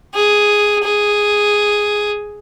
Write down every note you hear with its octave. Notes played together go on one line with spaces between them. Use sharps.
G#4
G#4